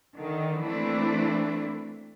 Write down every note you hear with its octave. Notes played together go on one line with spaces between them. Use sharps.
D3 D#3
E3 A3 A#3 C4 D4 E4